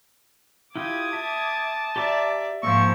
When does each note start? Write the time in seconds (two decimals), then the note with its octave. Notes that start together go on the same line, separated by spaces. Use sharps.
0.76 E4 F4 G4 D6 D#6 G#6
1.13 E5 A5
1.96 G4 D5 E5 A#5 D6
2.63 G#2 F3 A#3 C#6 E6